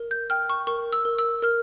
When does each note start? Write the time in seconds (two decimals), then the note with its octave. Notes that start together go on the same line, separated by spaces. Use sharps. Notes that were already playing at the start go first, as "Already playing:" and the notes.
Already playing: A#4
0.11 G6
0.30 G5 F6
0.50 C#6
0.67 A#4 C#6
0.93 E6
1.05 A#4
1.18 E6
1.42 A#4 F6